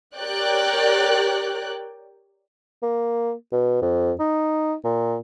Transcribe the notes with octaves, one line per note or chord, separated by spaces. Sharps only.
G4 A#4 C#5 D5 G5 F#6
A#3
B2
F2
D#4
A#2